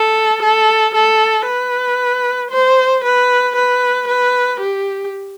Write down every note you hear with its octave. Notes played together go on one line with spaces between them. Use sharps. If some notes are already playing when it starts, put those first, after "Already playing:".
Already playing: A4
A4
A4
B4
C5
B4
B4
B4
G4